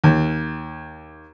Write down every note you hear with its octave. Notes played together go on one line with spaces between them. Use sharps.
D#2